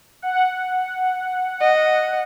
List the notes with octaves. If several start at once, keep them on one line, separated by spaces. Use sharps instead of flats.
F#5
D#5